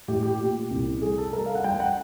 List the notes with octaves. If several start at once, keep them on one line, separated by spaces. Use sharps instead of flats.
A2 G4
G4
A#2 G4
C2
G3 G#4
A4
G3 A#4
F5
F#5
G3 G5
F#5